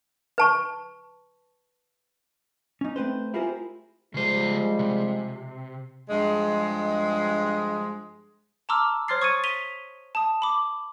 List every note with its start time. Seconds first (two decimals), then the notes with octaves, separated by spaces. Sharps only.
0.38 B4 A5 C#6
2.81 C#4 D#4
2.96 A3 C4 B4 C5
3.34 E4 F4 G4 G#4 A#4 C5
4.14 C#3 F3 G3 G#3 C5
4.79 C3
6.09 G2 F3 G#3
8.69 A5 A#5 C6 D6 E6 F6
9.08 C5 C#5 C6 F6 A6 C7
9.22 C#6 D#6 G#6 A6 C#7 D#7
9.44 B6 D#7 F7 G7
10.15 A5 D#6
10.42 B5 D6